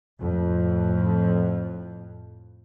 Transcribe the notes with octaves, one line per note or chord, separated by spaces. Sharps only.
F2 A2